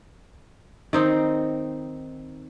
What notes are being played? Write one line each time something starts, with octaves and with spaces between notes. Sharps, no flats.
D#3 C4 D#4